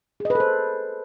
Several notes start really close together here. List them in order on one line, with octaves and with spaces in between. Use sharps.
G#4 D#5 B4 A4 C5